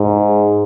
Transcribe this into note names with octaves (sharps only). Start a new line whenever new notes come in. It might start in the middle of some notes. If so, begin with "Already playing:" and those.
Already playing: G#2